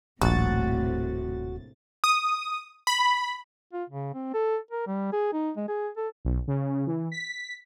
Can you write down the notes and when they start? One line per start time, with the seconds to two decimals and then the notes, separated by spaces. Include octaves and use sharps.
0.22 D#1 A#1 A2 C3 F#4 A6
2.04 D#6
2.87 B5
3.73 F4
3.90 C#3
4.14 C4
4.34 A4
4.71 A#4
4.87 G3
5.13 G#4
5.33 D#4
5.56 G#3
5.68 G#4
5.97 A4
6.25 B1
6.47 C#3
6.87 E3
7.12 B6